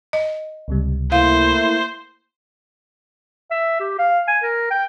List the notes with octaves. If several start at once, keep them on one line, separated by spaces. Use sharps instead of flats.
D#5
C#2 C3 G3
A3 A#3 E4 C5 F5
E5
G4
F5
G#5
A#4
G5